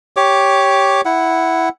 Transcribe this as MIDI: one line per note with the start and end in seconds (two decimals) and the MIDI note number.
0.17 1.01 67
0.17 1.01 73
0.17 1.01 86
1.05 1.69 64
1.05 1.69 78